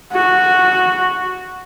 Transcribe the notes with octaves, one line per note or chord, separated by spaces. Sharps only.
F#4